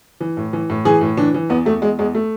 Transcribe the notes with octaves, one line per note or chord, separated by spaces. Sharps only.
E3
A2
E3
A2
E3 G#4
A2
E3 D4
E3
E2 B3
E2 A3
E2 G#3
E2 G#3
A3